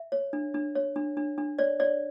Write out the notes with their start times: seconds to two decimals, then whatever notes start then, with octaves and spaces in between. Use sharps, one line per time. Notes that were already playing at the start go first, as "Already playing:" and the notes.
Already playing: E5
0.12 C#5
0.33 D4
0.54 D4
0.75 C#5
0.96 D4
1.17 D4
1.38 D4
1.59 C#5 D5
1.80 C#5 D5